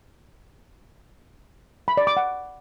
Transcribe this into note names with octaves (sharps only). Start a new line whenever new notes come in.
B5
D5
D6
F#5